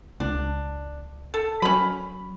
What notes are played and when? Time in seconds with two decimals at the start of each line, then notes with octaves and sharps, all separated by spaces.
0.20 C#2 D4
1.34 A4
1.62 F#3 C#4 B5